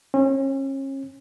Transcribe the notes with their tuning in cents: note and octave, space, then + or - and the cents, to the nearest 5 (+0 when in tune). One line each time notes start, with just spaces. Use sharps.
C#4 -35